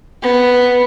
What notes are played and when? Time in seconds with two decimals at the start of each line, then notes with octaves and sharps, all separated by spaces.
0.22 B3